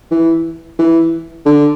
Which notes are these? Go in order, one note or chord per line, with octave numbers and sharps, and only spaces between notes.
E3
E3
D3